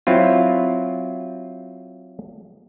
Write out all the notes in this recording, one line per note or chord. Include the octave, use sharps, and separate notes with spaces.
F#3 C4 E4 F4